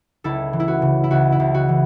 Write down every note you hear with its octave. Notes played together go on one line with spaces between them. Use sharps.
C#2 E4 A4
E3
E4
F#4
C#3
E4
C#2 F#4
E4
C#2
F#4
E3